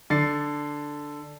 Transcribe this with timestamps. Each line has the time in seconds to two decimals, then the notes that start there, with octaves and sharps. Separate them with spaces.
0.10 D3 A6 C7